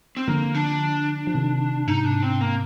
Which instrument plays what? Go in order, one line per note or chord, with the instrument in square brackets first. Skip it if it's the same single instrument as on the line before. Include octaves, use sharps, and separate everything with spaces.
[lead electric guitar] C4
[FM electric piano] D3 F3 [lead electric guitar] A#3
[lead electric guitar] D4
[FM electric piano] F3
C3 D#3
[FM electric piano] G#2 C3 [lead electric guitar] D#4
[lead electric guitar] D4
C4
A#3